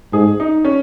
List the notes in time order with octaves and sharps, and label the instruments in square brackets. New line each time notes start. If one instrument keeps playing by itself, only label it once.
[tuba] G#2 [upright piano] G#4
[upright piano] D#4
C#4